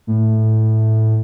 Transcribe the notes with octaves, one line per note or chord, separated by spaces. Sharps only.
A2